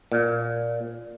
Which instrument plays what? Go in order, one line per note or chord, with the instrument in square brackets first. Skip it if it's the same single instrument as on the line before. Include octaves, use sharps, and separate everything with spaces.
[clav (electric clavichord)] A#2